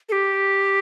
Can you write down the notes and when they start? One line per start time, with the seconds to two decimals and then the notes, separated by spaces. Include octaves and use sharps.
0.09 A4
0.12 G4